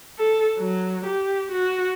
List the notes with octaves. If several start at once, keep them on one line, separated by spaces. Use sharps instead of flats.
A4
F#3
G4
F#4